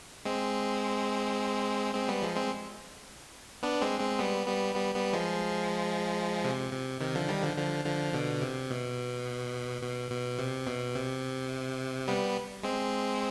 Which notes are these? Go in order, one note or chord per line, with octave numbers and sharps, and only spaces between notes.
G#3 C4
G#3 C4
G3 B3
F3 G#3
G#3 C4
B3 D4
G#3 C4
G#3 C4
G3 B3
G3 B3
G3 B3
G3 B3
F3 G#3
C3
C3
C3 D#3
D3 F3
D#3 G3
D3 F3
D3 F3
D3 F3
B2 D3
C3
B2
B2
B2
C3
B2
C3
G3 B3
G#3 C4